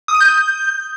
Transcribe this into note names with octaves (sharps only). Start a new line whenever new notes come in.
D#6
D#7
G6